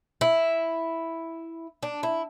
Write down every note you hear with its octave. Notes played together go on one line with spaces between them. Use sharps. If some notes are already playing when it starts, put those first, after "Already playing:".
E4
D4
E4